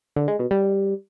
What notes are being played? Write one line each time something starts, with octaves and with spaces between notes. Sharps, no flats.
D3
G#3
B2
G3